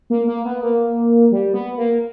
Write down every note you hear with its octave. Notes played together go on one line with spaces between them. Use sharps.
A#3
A#3
B3
A#3
G3
B3
A#3